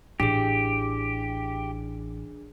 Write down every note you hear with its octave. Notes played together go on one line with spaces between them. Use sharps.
A1 D4 G4 G#4